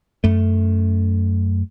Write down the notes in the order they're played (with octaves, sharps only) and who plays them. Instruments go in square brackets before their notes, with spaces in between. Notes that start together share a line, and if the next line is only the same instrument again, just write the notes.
[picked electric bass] F#2 A3